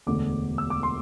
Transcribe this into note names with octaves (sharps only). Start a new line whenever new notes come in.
E1 D2 D3 D6
E6
D6
C6